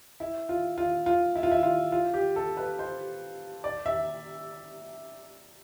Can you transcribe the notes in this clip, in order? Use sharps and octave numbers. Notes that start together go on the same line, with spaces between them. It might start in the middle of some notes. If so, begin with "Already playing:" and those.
E4
F4
F4
F4
E4
F4
E4
F4
F4
G4
A4
B4
C5
D5
E5